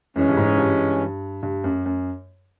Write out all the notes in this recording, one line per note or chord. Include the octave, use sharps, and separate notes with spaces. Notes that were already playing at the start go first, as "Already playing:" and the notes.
F#2 E3 G#3 C#4
G2
G#2
G2
G2
F#2
F#2